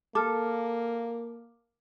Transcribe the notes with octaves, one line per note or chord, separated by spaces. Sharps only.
A#3 A4 D6 F6